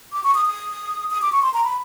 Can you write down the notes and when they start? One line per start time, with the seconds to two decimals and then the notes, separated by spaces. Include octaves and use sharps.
0.13 D6
0.24 C#6
0.35 D#6
0.46 D#6
1.11 D#6
1.22 D6
1.32 C#6
1.42 C6
1.54 A#5
1.65 B5